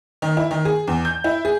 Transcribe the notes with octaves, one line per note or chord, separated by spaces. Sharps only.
D#3
E4
D#3
G#4
E2
G6
E4
G#4